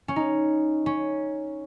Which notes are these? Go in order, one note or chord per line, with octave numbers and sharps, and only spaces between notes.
C#4
D#4
C#4